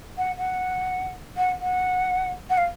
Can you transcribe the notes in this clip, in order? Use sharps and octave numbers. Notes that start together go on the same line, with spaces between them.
F#5
F#5
F#5
F#5
F#5
F5